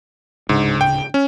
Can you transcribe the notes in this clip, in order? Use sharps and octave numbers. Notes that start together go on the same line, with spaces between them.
D1 G#2 C#3 D4
G5
C#4